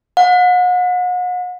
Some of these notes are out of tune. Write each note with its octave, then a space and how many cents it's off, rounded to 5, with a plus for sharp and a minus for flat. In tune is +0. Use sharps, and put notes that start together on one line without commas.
F#5 -40